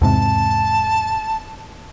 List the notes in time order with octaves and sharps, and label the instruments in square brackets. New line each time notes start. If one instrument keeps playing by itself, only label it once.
[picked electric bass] E2 G#2 C3 [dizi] A5